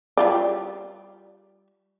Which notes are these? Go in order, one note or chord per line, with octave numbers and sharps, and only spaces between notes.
G3 F4 D5